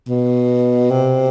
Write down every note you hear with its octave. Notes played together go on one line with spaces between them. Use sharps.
B2
C3